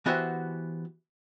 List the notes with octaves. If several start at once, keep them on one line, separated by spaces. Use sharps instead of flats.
E3 B3 F#4 G4 C5 E5